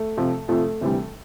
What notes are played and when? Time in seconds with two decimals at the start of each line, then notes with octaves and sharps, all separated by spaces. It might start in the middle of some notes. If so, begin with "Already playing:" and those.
Already playing: A3
0.17 F2 C3 F3
0.48 F2 C3 F3 A3
0.81 D2 C3 E3 G3